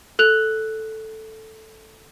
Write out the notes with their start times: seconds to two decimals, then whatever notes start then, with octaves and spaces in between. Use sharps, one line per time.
0.19 A4 F#6 F7